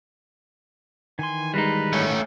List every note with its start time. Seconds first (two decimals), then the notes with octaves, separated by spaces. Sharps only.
1.19 D#3 E3 G#5 C6
1.54 G3 G#3 D#4 B4
1.93 A3 C#4